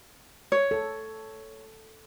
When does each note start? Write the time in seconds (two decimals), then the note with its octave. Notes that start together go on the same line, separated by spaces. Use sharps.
0.52 C#5
0.71 A4